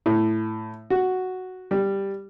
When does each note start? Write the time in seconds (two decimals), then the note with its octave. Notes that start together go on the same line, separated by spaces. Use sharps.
0.06 A2
0.90 F#4
1.71 G3